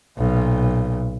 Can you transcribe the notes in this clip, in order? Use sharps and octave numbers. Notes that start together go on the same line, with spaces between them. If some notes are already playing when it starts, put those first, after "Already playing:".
B1 A#2